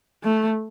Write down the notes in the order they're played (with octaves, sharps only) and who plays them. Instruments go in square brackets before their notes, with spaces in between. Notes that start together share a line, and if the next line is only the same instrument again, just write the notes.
[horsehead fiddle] A3